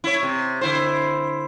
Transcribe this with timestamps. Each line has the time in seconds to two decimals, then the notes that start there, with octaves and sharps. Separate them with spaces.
0.04 E4 C#5
0.23 C3
0.61 D3 E4 C5